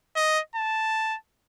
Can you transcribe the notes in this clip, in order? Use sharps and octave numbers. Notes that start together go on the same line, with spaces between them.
D#5
A5